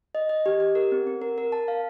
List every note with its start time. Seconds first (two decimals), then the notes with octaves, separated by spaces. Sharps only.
0.15 D#5
0.29 D#5
0.46 G4
0.60 G4
0.75 A#4
0.92 C4
1.07 C4
1.22 A#4
1.38 A#4
1.52 A5
1.68 F5